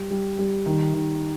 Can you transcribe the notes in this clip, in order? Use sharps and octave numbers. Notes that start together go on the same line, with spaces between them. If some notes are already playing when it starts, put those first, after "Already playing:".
Already playing: G3
G3
G3
D#3
D#3